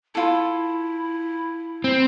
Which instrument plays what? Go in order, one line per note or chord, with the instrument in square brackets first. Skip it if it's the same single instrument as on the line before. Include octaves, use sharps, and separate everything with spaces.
[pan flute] E4 [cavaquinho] F4 A4
[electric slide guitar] C4